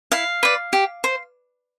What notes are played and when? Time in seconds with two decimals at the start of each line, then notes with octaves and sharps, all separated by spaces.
0.12 E4 F5
0.43 B4 D5
0.73 G4
1.04 C5